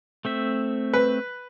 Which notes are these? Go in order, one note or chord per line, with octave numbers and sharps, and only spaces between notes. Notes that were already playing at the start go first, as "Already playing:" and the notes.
A3 C4 E5
B4